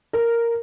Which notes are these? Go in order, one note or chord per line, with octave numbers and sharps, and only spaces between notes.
A#4